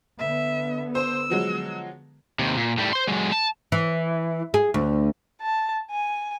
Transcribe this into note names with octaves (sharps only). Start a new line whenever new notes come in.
D3 B3 E5
C5 E6
F3 F#3 G#3
D#2 C3
A#2
A2 G3
C5 C6
F#3 G#3
A5
E3
G#4
D2
A5
G#5